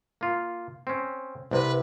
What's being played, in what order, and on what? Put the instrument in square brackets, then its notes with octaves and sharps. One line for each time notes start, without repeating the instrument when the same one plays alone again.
[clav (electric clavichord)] A#3 F4
C4 C#4
[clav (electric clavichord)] C2 C3 [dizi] B4